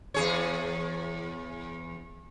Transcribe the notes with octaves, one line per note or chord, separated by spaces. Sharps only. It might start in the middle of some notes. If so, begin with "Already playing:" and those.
E2 G#4 C#5